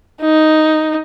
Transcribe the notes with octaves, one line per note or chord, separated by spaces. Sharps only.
D#4